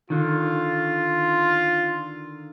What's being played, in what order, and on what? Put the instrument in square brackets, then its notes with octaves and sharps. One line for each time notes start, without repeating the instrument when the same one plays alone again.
[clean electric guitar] D3 D#3 [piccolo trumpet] F4